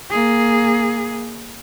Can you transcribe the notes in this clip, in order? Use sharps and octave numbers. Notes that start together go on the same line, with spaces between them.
A#3 G#4